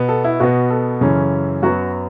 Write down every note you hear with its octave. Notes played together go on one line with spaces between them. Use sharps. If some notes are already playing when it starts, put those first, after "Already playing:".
Already playing: B2 B3
A4
E4
B2 B3 F#4
A4
F#2 C#3 E3 C#4
F#2 F#3 B3 F#4